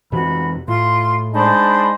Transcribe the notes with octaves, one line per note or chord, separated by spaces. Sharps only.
F2 C3 E3 F#4 B5
A2 F4 C6
G#3 D4 D#4 C5 A5 B5